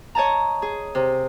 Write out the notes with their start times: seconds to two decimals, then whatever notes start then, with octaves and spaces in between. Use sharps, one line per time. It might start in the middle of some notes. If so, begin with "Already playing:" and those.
0.15 C#5 D#5 A5 A#5
0.62 G#4
0.95 C3